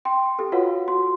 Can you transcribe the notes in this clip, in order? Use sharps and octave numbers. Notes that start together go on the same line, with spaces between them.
G5 C6
G4 A4
F4 F#4 B4 C#5 F5 F#5
F#4 C6